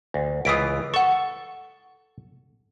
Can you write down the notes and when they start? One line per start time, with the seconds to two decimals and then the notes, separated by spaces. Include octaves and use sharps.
0.14 D2
0.45 C#2 E3 F4 D#6 B6 D7
0.94 A4 F#5 C#6